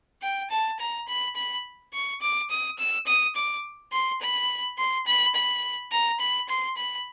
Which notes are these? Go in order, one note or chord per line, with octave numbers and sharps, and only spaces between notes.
G5
A5
A#5
B5
B5
C#6
D6
D#6
E6
D#6
D6
C6
B5
C6
B5
B5
A#5
B5
C6
B5